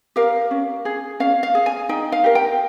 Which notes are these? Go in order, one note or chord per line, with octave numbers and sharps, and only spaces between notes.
G4 A#4 F5
C#4
G#4
C#4 F5
F5
G#4
G#5
D#4 G5
F5
G4 A#4
G5